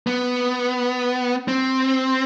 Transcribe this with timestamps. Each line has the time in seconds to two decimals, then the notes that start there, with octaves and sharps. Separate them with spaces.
0.07 B3
1.48 C4